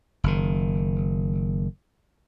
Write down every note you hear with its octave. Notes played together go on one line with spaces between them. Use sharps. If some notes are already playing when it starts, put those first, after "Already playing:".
F#1 D#3